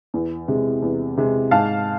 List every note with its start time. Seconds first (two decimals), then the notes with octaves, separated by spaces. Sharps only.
0.14 E2
0.48 C3 G#3
0.82 E2
1.17 C3 G#3
1.51 G#2 F5 A5